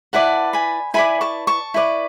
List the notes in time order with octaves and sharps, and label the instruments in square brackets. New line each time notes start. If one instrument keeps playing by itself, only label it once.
[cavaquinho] E4 B4 D5 F#5 A5
G#5 B5
E4 B4 D5 G#5 B5
A5 C#6
A5 C#6
E4 B4 D5